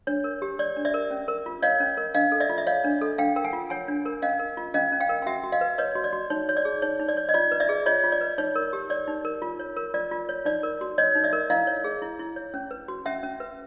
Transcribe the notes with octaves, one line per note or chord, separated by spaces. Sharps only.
D4 C#5
A#4
G4
C#5 D5
D4
D5 E5
A#4
C#4
A#4
F4
C#5 D#5 F5
C#4
A#4
D4 D#5 F5
A4
D5 E5
F4
E5
C#5 D#5 F5
D4
A4
D4 F5 G5
A#4 G5
F#5 G#5
F4
C#5 F#5 G#5
D4
A#4
C#4 D#5 F5
A#4
F4
C#4 D#5 F5
C#4
F5 G5
A#4
G5
F#4 E5 F#5
F#4
D#5 F5
B4
B4 C#5 D#5
F#4
D5
F#4
D#4 C#5
C#5
D5
G#4
D#4 C#5
D#4
D5
C#5
D#5
F4 D5
B4
D5 E5
G#4
F4 C#5 D#5
F4
D5
B4
D#4 C#5
A#4
G4
C#5 D5
D#4
A#4
F4
C#5
A#4
F4 D5
F4
C#5
D#4 D5
A#4
F#4
C#5 D#5
D#4
D5 E5
A#4
E4 D#5 F5
C#5
G#4
E4
E4
C#5
C#4
B4
F#4
C#4 E5 F#5
C#4
B4